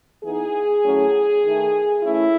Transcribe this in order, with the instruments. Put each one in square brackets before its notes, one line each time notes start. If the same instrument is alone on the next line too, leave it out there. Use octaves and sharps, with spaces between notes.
[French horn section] E3 B3 D#4 G#4
A2 F#3 C#4
D#3 A3 D#4
E3 A3 C#4 E4